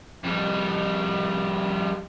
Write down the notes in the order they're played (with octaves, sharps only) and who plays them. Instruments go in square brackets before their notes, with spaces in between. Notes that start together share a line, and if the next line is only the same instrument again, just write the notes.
[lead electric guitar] F2 G3